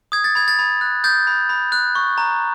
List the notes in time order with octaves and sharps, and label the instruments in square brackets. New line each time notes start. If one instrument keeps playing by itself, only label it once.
[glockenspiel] D#6 G#6
A6
B5 G#6
A6
B5 G#6
F#6
D#6 G6 A6
B5
B5
F#6
C#6
A#5